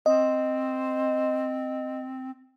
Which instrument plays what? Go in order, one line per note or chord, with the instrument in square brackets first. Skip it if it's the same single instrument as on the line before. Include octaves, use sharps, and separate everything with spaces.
[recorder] C4 [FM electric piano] D#5